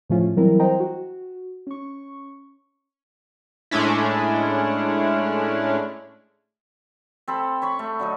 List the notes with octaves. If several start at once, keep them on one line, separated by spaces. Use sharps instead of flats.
A2 C#3 F3 A3 C#4 F4
E3 F#3 G3 C4 E4 A#4
C5 D#5 G5 A#5
F#4
C#4 C#6
A2 G#3 A3 C#4 D4 E4
C4 A4 B5
C#5 B5 C#6
A3
D3 F#3 D#4